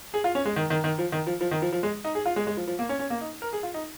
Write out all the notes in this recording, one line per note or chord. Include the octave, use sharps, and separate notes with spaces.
G#4
F4
C#4
G#3
D#3
D#3
D#3
F3
D#3
F3
F3
D#3
F3
F3
G#3
D#4
G#4
F4
G#3
G#3
F3
F3
A#3
C#4
C#4
A#3
D#4
A#4
G#4
F4
D#4